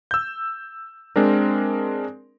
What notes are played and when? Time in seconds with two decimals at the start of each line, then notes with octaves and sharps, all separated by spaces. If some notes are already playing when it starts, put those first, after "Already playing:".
0.11 E6 G6
1.16 G#3 C4 D4 A#4